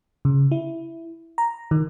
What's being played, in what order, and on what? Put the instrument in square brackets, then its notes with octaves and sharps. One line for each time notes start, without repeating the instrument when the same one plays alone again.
[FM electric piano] C#3
E4
A#5
D#3